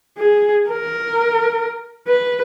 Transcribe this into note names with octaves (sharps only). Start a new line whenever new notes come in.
G#4
A#4
B4